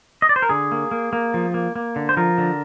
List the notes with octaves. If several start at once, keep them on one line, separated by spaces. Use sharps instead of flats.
D#5
D5
C5
A#4
D3 G#4
A#3
A#3
A#3
F3
A#3
A#3
D3
C5
F3 A#4
D3